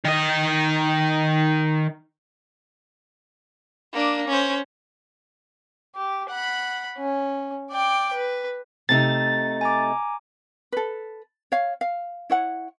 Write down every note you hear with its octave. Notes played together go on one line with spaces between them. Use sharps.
D#3 D#5
A#3 D4
C#4 C5
G4
F#5 B5
C#4
D5 G5
B4
C3 A3 D#4 A6
G#5 A#5 D6
A4 B4
C#5 F5
F5
E4 C#5 F#5